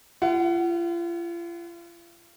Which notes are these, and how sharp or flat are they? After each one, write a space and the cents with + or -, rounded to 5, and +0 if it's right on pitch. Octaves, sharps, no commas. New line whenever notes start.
F4 -40 F#5 +20